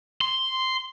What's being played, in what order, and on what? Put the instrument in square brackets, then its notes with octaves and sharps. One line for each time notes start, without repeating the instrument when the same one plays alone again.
[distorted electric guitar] C6